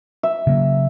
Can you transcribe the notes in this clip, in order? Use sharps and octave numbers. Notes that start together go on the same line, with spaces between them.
E5
C#3 F#3 A#3